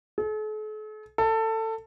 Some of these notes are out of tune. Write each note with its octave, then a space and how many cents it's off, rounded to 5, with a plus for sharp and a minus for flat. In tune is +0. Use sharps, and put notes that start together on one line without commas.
A4 -45
A4 +20